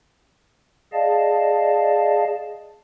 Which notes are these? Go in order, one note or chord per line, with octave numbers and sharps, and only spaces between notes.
G#4 D5 D#5 F5 A5